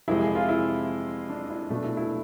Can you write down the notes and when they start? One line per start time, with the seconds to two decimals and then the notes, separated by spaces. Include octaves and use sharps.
0.08 F2 C3 G#3 E4
0.21 G#4
0.35 F4
0.49 E4
1.30 D4
1.50 E4
1.70 B2 A3 D4
1.84 E4
1.97 E4